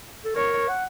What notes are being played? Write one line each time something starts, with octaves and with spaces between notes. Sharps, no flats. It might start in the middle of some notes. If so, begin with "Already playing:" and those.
A4
A#4 C#5
F#5